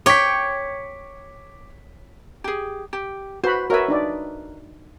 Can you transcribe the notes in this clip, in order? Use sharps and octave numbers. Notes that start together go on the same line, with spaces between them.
C#5 G5 D6 B6
G4 G#4
G4
F#4 B4 C5 B5
F#4 A#4 B4 C#5 E5
D4 D#4 D5